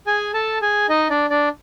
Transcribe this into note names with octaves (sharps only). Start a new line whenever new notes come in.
G#4 G#5
A4 A5
G#4 G#5
D#4 D#5
D4 D5
D4 D5